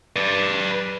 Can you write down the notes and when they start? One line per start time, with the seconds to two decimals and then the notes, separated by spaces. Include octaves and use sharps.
0.16 B4 D5